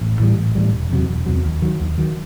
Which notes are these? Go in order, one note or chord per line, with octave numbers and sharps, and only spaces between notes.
A1
A2 E3 G3
A1
A2 E3 G3
E1
E2 C3 F#3
E1
E2 C3 F#3
D#2
D#3 F#3
D#2
D#3 F#3